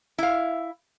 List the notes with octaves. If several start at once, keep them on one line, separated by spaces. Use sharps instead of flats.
E4 F5